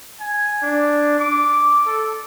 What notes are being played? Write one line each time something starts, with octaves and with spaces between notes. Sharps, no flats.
G#5
D4
D6
A4